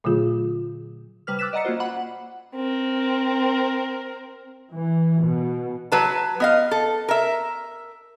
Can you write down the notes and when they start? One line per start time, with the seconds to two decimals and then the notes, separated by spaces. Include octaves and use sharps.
0.04 A#2 D3 F#3 A3 F4 G#4
1.27 C3 G3 B4 F6
1.39 D6 E6 F#6 A6 B6 E7
1.53 D5 D#5 F#5 A#5 A6 C#7
1.65 A#3 C#4 F4 F#4 C5
1.80 F#5 B5 D6
2.55 C4 A#4
4.72 E3
5.20 B2
5.92 F#3 B4 A5
6.40 B3 D#5 F5
6.71 A4
7.09 A#4 E5